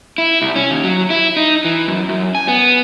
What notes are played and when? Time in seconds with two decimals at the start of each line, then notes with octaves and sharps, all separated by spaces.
0.18 E4
0.41 C2
0.56 C#4
0.71 D#2
0.84 F#3
1.10 E4
1.36 D#4
1.65 E3
1.88 F#2
2.09 F#2
2.35 G#5
2.48 B3